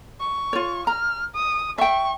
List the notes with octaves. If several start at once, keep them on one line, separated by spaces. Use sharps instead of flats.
C#6
F4 C#5
A#5 F6
D#6
E5 G5 C#6